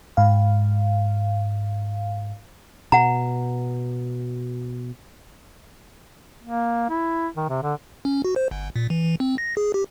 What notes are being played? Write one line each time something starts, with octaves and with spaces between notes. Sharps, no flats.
G#2 F5
B2 F#5 A#5
A#3
E4
D#3
C3
D3
C#4
F#4
C5
G1
A#2
E3
E3
C4
A#6
G#4
G4